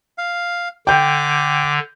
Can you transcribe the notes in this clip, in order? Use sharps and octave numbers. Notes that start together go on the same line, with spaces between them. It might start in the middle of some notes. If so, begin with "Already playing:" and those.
F5
D3 G5 D6 G6